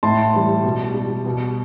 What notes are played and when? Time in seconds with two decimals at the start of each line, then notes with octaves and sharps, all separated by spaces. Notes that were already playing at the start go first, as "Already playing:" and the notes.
0.03 A2 A5 C6
0.34 E3 G3
0.63 B2
0.94 G3
1.26 B2